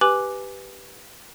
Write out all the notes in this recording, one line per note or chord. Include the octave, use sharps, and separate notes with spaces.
G4 B4 G#5 D6 F#6 F#7